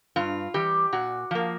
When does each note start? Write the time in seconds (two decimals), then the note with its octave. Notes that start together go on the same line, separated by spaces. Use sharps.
0.16 G2 F4
0.54 E3 G3 G4
0.93 A#2 F#4
1.31 F3 A#3